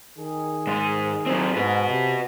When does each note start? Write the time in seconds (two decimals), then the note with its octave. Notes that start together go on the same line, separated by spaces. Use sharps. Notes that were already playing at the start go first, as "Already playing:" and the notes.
0.19 D#3 G#4
0.67 G#2 G#3
1.26 F#3 C4
1.56 G#2 F#4 B4
1.89 C3